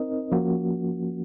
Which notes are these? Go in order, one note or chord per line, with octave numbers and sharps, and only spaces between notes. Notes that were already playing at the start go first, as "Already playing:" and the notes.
Already playing: C4 D#4 A#4 D#5
F3 A#3 C#4 F#4